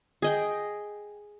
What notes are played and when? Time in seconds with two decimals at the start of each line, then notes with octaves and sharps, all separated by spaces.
0.22 G#4 D#5 G5